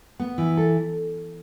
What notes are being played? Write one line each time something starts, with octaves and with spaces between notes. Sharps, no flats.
B3
E3
A4